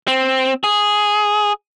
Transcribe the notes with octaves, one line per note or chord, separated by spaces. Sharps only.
C4
G#4